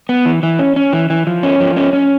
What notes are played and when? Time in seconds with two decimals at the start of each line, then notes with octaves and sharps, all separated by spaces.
0.09 B3
0.26 E3
0.43 E3
0.59 C#4
0.76 C#4
0.93 E3
1.10 E3
1.27 F3
1.43 C#4
1.60 F3
1.76 C#4
1.93 C#4